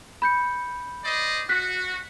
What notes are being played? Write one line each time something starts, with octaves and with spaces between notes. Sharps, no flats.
B5 G6 C#7
C5 D5 D#5
F#4 F#6 B6